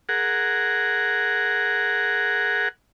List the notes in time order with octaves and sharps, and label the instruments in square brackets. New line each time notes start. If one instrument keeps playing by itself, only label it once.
[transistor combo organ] G#4 A#4 F#5